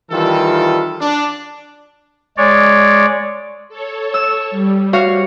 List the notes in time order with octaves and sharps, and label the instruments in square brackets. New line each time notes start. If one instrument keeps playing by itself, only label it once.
[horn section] D#3 E3 G3 F4 A4
D4
[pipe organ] G#3 C#5 D5
[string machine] A4 C#5
[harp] E6
[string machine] G3
[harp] F#4 C#5 F5